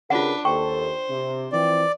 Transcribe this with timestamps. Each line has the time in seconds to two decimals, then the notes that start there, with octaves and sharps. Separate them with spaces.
0.10 C#3 D4 F4 G4 A#4 B4 F#5
0.45 D#2 A4 C5 G5 C#6
1.09 C3
1.52 E3 F3 C4 D5